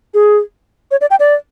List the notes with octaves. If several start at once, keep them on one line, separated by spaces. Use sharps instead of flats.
G#4
C#5
D5
G5
D5